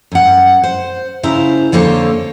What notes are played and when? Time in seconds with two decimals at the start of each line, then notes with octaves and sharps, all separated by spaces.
0.12 F#2 F#5
0.64 C5
1.23 C#3 E4 F4 C5 A#5
1.72 F2 D3 A#3 A4 C5 C#5